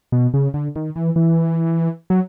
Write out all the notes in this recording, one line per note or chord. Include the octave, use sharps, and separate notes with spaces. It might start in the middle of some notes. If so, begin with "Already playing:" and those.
B2
C#3
D3
D#3
E3
E3
F#3